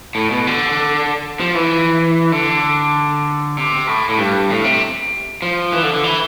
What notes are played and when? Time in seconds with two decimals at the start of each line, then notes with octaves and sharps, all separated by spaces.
0.15 A2
0.31 B2
0.47 D3
1.40 F3
1.55 E3
2.32 D3
3.57 C3
3.87 A2
4.09 A2
4.18 G2
4.50 A2
4.64 C3
5.42 F3
5.73 E3
5.83 D3
5.94 D3
6.04 E3